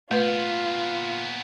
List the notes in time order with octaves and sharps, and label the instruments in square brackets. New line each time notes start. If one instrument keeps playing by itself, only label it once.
[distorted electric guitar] A#2 B3 [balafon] A3 B4 [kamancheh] F4